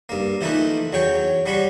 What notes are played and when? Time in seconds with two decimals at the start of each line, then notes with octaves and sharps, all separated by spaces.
0.09 G2 A#3
0.41 E3 F3 A3 A#3 D#4 B4
0.93 E2 F#3 C#5 G5
1.46 F#3 G3 F#4 B5 C#6